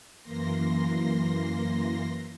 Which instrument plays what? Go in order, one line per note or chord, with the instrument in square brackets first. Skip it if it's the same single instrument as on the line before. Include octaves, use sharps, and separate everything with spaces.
[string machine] F#2 E3 A#3 C6 A#6